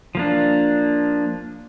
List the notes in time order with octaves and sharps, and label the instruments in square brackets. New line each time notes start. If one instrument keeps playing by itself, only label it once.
[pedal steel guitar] F3 A#3 D4